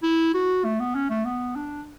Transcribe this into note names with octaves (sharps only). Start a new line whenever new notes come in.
E4
F#4
A3
B3
C#4
A3
B3
D4